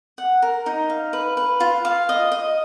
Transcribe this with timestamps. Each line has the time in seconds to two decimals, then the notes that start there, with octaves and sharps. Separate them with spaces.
0.18 F#5
0.42 A#4
0.66 D#4
0.90 F5
1.13 B4
1.37 B4
1.60 F4
1.85 F5
2.09 D#5
2.32 D#5